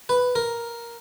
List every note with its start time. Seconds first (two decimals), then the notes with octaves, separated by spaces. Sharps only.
0.09 B4
0.35 A#4